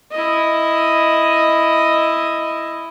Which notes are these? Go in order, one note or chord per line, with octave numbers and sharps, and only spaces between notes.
E4 D#5